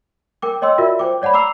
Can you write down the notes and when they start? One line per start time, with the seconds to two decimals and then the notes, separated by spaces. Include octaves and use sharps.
0.42 A#4 G5 D6
0.62 C#5 D#5 G5 C6 E6
0.78 F4 F#4 A#4 D5 E5
0.99 C5 G5 D6
1.22 C#5 D5 F#5 A5 B5
1.34 A#5 D6 E6 C7 F7